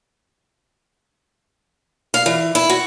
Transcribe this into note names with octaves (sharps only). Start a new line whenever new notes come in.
F5
E3
E4
F#4